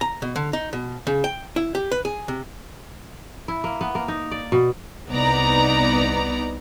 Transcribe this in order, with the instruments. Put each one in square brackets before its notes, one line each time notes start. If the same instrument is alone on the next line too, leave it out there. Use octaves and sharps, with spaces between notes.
[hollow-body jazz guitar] A#5
B2
D3
D#4
B2
C#3
G5
E4
G4
B4
G#4
C3
[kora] E4
A#3
B3
A#3
D#4
D5
B2
[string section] C2 B3 D#4 D5 A#5